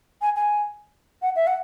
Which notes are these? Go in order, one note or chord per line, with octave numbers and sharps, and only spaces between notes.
G#5
G#5
F#5
E5
F#5